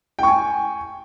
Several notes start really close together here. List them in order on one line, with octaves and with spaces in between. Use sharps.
G5 C#6 G#5